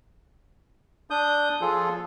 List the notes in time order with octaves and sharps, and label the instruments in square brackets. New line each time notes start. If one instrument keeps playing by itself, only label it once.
[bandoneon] D4 D#6 G6
F3 F4 G#4 A4